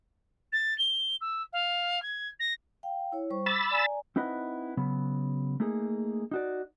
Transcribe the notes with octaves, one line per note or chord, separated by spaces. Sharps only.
A6
G7
E6
F5
G#6
A#6
F5 G5
E4 C#5
G3 C5 C#6
B5 D6 E6 A6
D5 G#5 A#5
C4 D#4 E4 B4 D#5 F#5
C#3 F#3 B3
A3 A#3 D#4 G#4
D#4 F#4 D5